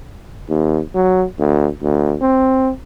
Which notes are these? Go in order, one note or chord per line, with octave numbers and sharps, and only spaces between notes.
D#2
F#3
D2
D2
C4